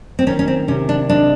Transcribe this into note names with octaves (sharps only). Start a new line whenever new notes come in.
C4
D#3 C#4
C#4
C4
C3 C#4
D4
G#3 D4